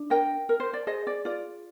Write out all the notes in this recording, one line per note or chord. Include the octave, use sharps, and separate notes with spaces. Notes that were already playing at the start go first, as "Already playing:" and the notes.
Already playing: D4
A#4 D#5 G5
A#4
C5
D5
G#4 C5 D#5
D5
F4 D5